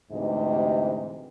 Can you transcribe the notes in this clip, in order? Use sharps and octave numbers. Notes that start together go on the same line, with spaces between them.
D2 G#2 C3 E3 D#5